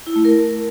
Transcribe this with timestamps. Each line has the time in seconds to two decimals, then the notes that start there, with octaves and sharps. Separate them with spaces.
0.07 E4
0.16 A3
0.25 A#4